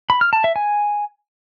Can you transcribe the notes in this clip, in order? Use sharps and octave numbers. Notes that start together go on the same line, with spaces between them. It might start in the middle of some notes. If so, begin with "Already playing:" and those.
B5
F6
A5
E5
G#5